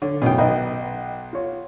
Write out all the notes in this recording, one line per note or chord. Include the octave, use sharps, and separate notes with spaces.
D3 C#5
A1 F#2 B2 D#3 G5
B1 B4 D#5 G5
F4 C#5